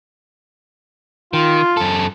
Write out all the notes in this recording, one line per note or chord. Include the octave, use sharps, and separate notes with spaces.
D#3 F4
F#2 A4